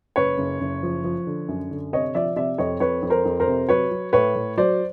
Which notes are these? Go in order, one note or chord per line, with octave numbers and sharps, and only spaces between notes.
F#1 B4 C#5
F#1
F#1
F3
F3
D3
F#2
D3
C3 C#5 D#5
F3 D5 E5
C3 D5 E5
F2 C#5 D#5
F2 B4 C#5
F2
A#4 C5
F2
A#4 C5
C3
F#3 B4 C#5
F#3
A2 B4 C#5
A2
F#3 C5 D5